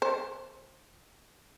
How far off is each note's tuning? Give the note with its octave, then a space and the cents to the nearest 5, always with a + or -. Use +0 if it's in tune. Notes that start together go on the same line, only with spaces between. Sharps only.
C5 +25